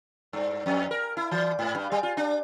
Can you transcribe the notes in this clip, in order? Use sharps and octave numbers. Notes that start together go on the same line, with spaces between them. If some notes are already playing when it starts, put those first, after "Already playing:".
G2
F2
A#4
E4
E3
G#2
G2
G3
F4
D4